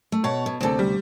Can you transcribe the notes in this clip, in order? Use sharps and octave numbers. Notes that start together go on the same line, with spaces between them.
A3
B2 C#5 F#5 A5
B2
D2 C3 C4 A4
G3